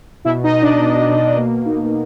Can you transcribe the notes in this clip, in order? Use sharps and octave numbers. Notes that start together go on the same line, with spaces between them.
B2 E4 E5
D#4 D#5
B2
D4 D5
B2
B2
A#3
D#4